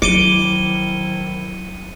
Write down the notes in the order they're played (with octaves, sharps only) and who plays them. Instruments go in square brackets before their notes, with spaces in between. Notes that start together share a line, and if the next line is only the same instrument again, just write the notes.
[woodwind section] D#3 F3 E4 [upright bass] F#3 [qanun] D6 [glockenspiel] C#7 D#7 G7